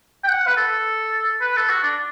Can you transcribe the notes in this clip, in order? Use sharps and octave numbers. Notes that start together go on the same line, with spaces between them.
G5
F#5
B4
A4
B4
A4
F#4
D4